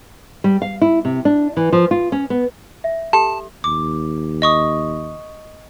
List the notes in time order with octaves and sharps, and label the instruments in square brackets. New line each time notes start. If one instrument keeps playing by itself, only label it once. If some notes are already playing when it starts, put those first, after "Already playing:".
[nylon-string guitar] G3
F5
E4
C3
D4
E3
F3
F4
C#4
B3
[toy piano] E5
[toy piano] G4 A4 [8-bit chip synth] A5
[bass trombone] D#2 [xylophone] D6
[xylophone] D#5 C#6 D#6